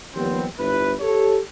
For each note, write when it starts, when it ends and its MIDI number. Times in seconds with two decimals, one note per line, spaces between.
0.14 0.45 39
0.14 0.45 53
0.14 0.45 55
0.14 0.45 59
0.14 0.45 60
0.59 0.94 31
0.59 0.94 64
0.59 0.94 71
1.00 1.38 67
1.00 1.38 69
1.00 1.38 73